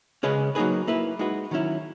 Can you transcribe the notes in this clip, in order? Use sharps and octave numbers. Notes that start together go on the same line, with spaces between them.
C#3 G#3 C#4 G#4 B4
F#3 A#3 D#4 G#4 B4
A#3 E4 B4
G#3 D#4 F#4 B4
D#3 F#3 C#4 E4